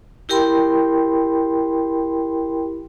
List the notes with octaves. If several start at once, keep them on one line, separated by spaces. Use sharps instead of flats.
E4 G4 A#4 G5 B5 C6